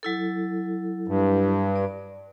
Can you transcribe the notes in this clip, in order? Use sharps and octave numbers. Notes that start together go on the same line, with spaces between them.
F#3 E4 A4
G2
D5